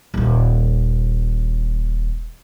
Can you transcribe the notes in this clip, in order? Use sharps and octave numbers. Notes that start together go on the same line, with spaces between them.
D#1 D#2